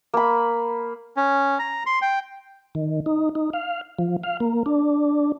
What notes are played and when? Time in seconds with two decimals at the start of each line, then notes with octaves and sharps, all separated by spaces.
0.14 A#3 B5
1.17 C#4
1.59 A#5
1.86 C6
2.02 G5
2.75 D#3
3.06 D#4
3.35 D#4
3.53 F5
3.99 F3
4.24 F5
4.40 A#3
4.66 D4